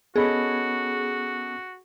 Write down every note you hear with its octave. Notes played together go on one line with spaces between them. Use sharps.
B3 C#4 F#4 G#4 A4 D#5 B5